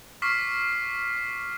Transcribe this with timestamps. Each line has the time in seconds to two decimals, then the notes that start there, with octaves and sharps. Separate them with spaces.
0.22 C#6 D6 F6 B6 C7